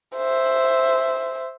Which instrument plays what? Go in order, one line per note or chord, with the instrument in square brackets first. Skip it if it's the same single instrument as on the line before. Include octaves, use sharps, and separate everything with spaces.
[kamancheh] C5 E5